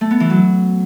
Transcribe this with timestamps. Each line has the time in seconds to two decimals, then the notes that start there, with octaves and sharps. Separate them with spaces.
0.01 A3
0.11 B3
0.20 E3
0.30 F#3